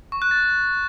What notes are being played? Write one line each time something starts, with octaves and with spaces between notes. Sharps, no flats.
C#6
F#6
A6